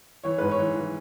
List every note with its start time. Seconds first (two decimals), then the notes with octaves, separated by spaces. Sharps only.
0.24 E3 C#5
0.38 G#2 B4
0.51 C#5
0.59 E3
0.76 E3